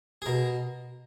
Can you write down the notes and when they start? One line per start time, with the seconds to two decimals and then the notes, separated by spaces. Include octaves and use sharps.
0.22 G#4
0.26 B2 A#4